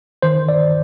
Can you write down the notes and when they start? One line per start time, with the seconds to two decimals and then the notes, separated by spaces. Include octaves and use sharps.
0.22 D#3 C5
0.49 D5